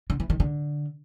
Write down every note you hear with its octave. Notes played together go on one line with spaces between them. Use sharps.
D3
E3
D#3
D3